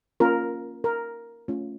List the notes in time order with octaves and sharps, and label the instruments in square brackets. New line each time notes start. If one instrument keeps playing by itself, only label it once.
[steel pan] A#3 C#4 F4 A#4
A#4
A3 C#4 F4